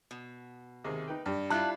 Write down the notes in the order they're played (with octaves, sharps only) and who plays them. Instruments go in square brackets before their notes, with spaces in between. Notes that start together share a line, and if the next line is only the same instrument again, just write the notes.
[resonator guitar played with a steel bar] B2
[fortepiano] D#2 C3 G#4
D#4 B4 G5
[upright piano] G2 [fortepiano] G4
[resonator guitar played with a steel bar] G3 E4 F4 [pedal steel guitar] A5 F#6